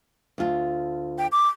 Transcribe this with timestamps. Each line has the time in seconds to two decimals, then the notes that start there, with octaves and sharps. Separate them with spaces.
0.38 D2 F4
1.18 G5
1.32 D6